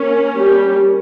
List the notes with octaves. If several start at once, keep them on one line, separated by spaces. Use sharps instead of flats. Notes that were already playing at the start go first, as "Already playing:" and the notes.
Already playing: A#3 C#4
G3 G4